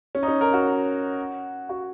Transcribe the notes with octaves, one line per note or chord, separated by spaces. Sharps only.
C#4
D#4
C#4
A#4
F#4
F#4